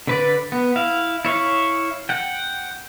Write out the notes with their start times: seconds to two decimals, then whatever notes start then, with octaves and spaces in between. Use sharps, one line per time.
0.07 D3 B4 D5
0.52 B3
0.76 E4 F5
1.25 E4 C#5 E5 F5
2.09 F#5 G5